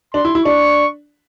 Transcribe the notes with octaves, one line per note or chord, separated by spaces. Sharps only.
D4 C6
E4
E4
D4 C#6